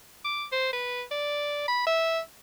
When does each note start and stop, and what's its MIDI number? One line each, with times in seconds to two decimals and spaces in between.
0.25 0.45 86
0.52 0.72 72
0.73 1.02 71
1.11 1.66 74
1.68 1.83 83
1.87 2.20 76